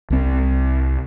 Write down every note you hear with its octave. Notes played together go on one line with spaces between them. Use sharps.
C2 C4